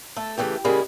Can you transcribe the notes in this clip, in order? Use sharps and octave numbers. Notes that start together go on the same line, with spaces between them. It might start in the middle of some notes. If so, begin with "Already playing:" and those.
A3 A4
C#3 E3 A3 G4
C#3 G3 G#3 A#3 E4 G#4